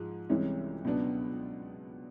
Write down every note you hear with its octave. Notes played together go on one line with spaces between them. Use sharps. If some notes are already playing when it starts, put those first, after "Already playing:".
Already playing: G#2 F3 G#3
C2 C3 E3 G#3 C#4
C#2 B2 F#3 B3 D4